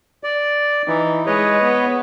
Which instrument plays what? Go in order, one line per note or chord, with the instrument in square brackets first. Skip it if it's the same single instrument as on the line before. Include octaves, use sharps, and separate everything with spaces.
[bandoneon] D5
[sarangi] E3 [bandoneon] D#4
[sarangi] G#3 [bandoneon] B4 C#5 D#5
[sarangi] B3